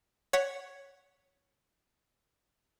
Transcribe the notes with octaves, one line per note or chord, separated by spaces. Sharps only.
C#5 F#5 B6